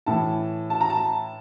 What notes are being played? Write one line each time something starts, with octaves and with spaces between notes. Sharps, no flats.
A2 E3 A5
A5
A#5
A5